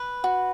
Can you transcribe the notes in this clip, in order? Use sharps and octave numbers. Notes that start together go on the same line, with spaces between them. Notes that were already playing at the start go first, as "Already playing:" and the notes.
Already playing: B4
F#4